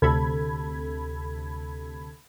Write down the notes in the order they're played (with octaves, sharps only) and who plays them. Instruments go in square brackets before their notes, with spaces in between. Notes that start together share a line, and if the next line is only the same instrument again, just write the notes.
[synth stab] D2 C3 A4 B5 G#6